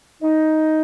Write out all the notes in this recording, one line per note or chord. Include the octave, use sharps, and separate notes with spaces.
D#4